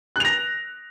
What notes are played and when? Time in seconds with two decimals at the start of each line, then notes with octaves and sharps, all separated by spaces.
0.16 F#6
0.20 F7
0.25 A#6